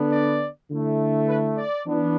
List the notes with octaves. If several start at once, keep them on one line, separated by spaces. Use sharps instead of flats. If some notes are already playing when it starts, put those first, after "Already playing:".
Already playing: D3 B3 D4
D5
D3 A3 E4
B4
D5
E3 B3 D4